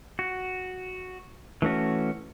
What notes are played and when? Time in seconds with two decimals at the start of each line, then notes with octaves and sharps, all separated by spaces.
0.19 F#4
1.62 E3 A3 C#4 F#4